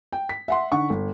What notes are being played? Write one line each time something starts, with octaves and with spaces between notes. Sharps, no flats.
G5
B6
E5 F#5 C6
D3 D#4 F#5 C#6
G1